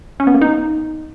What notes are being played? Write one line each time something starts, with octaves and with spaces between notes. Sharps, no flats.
C#4
B3
A#3
D#4